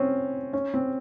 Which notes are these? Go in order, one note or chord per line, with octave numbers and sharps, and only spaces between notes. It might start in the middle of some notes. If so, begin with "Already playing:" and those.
Already playing: C4 C#4
C#4
C4